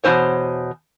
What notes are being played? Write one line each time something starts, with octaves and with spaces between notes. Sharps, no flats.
E2 B2 G3 C#4 C5 C#5